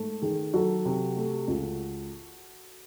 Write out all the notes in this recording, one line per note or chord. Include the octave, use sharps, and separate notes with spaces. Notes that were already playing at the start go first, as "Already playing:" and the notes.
Already playing: G#2 A3
D#3 G#4
F#3 F#4 A4
C3
A3
C#2